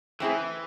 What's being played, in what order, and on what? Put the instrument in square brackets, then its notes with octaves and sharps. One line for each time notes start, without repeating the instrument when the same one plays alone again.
[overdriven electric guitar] E3 [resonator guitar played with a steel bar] A3 C4 E4 G#4